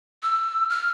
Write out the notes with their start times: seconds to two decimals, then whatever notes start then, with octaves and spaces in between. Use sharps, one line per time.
0.23 E6
0.70 F6